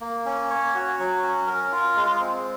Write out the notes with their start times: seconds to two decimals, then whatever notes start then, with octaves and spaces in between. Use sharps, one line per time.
0.01 A#3
0.25 C#4
0.50 C#5
0.75 F#4
0.99 F#3
1.23 C#4
1.47 A#4
1.72 F4
1.96 G#3
2.20 C4